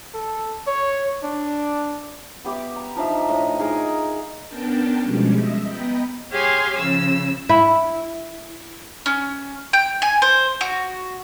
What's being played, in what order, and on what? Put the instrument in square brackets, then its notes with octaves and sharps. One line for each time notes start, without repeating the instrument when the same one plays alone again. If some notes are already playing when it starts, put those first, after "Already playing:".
[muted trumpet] A4
C#5
D4
[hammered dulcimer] B3 G4 E5 D6
A#5
F3 D4 D#4 E5
A2 D#5
D#4 G#4 A#4
[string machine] B3 C#4 D4 A#4 G5 A5
B2 F3 G3 G#3 C#4
D#5 E5
B3 D#5 G5 A#5 B5
[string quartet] G4 G#4 C#5 F5 G#5 C6
C#3 F3 E6
[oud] E4
[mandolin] C#4
G5
G#5
C5
F#4